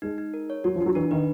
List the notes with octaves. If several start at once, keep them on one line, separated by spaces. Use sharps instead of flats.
G#3 D#4
D#4
A#4
C#5
F#3 F#4
F3
D4
F#3
E3 D4
D#3 B4